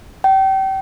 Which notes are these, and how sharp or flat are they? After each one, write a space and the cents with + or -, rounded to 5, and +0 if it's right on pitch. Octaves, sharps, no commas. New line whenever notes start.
G5 -30